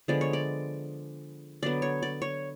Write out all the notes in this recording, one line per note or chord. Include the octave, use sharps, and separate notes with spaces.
D3 F3 G#3 B3 D5
C#5
D5
D3 F#3 B3 D5
C#5
D5
C#5